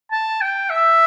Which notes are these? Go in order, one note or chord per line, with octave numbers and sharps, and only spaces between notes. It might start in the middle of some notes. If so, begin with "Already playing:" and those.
A5
G5
E5